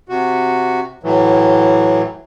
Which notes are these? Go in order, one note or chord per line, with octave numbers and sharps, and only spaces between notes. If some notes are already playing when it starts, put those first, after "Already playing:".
C3 F#4
A2 E3 F#3